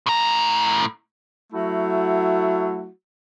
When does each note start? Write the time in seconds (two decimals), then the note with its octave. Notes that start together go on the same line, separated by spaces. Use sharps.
0.06 A2 A#5
1.53 F#3 A3 E4 F#4